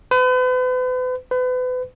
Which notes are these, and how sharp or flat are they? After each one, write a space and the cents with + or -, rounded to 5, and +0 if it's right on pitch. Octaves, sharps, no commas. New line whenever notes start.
B4 +40
B4 +35